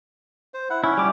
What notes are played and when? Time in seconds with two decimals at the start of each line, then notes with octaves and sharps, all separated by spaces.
0.54 C5
0.70 E4 F#5
0.84 C#4 E4
0.97 G3 D6